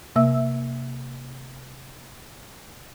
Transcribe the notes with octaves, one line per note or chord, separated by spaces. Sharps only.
C3 A#3 E5 E6